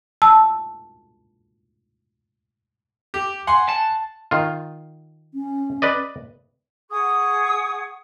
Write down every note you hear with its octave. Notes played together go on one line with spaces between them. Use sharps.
A5 E6
G4
F#5 G#5 C6
A5
D#3 F4
C#4
B4 D5 D#5
G#4 F#5 C#6 D#6